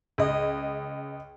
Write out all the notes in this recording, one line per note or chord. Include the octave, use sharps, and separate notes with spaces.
C#2 D#5